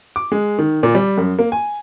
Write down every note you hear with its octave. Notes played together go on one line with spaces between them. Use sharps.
D6
G#3
D#3
A#2
G3
F#2
A#3
G#5